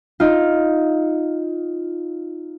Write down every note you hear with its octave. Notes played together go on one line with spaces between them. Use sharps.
D#4 F4